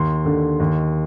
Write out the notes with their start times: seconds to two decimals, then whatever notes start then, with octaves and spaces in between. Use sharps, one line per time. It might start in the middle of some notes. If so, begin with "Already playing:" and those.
Already playing: D#2 C6
0.25 D3
0.60 D#2